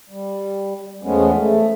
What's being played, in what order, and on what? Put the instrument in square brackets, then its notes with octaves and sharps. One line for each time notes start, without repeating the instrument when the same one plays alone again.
[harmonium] G3
E2 F3 G#3 A3 B3 C#4
A3